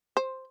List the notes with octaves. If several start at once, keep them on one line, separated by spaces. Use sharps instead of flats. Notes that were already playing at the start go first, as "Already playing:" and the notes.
C5